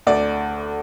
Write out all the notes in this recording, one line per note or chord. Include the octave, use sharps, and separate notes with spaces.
D2 D5